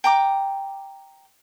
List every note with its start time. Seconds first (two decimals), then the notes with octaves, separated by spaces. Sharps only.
0.04 G5 A#5 D6